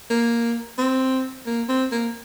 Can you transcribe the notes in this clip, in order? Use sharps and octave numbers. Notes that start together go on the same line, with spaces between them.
A#3
C4
A#3
C4
A#3